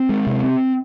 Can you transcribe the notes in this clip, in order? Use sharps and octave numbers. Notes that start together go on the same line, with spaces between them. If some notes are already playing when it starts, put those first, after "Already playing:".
Already playing: C4
G#3
C3
C4